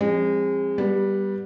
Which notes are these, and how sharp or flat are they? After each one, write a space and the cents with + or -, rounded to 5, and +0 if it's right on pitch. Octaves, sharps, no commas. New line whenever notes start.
F3 +0 G#3 -30 C4 +30
G3 +0 B3 -20